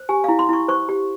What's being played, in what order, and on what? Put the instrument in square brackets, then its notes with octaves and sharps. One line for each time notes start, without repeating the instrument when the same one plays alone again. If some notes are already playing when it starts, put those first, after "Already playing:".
Already playing: [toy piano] C5
G4 G#5
E4 F5
C6
E4 C#6
C5 C#6
G4